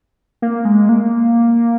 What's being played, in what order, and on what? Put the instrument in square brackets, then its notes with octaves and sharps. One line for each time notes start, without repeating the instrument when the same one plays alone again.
[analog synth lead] A#3
G#3
A#3